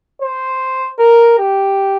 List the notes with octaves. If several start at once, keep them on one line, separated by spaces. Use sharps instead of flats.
C5
A#4
G4